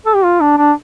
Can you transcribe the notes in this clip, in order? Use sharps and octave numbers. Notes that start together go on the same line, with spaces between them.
A4
G4
F4
D4
D4